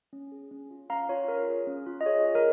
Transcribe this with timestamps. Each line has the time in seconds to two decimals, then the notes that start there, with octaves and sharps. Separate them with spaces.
0.13 C#4
0.32 G#4
0.51 C#4
0.70 F4
0.90 C#4 F5 A#5
1.09 F4 C#5
1.28 C#4 A#4
1.48 G#4
1.67 C#4
1.86 F4
2.01 D#5
2.06 G#4 C#5
2.25 G#4
2.35 A#4 D#5